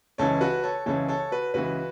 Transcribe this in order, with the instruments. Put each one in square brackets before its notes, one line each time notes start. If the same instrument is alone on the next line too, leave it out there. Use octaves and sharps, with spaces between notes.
[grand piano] C#2 C#3 E3 A4 C#5
F#4 B4
A4 C#5
C#2 C#3 E3 A4 C#5
A4 C#5
F#4 B4
C#2 C#3 E3 F#4 B4